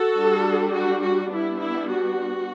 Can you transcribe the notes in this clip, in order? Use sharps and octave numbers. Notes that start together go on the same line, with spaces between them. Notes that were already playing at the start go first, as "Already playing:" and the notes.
Already playing: F#4 A4
G3 D4
F#4
F#4
G3 B3 D4 E4
E4
F#4